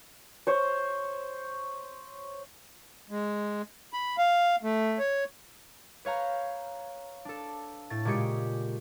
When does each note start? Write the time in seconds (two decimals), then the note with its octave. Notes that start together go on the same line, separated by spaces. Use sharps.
0.47 C5 C#5
3.10 G#3
3.93 B5
4.18 F5
4.63 A3
4.99 C#5
6.05 B4 C#5 F5 A#5 G6
7.25 D4 A4
7.90 A2 A6
8.05 A#2 C#3 G#3 G4 C#7 D7